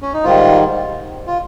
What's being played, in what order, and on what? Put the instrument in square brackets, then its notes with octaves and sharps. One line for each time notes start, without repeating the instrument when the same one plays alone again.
[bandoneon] C#4
D#4
G#2 D#3 G3 F4
F4